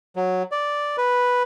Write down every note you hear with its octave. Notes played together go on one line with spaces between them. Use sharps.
F#3
D5
B4